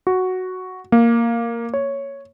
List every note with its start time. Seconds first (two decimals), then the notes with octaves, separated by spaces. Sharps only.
0.07 F#4
0.92 A#3
1.74 C#5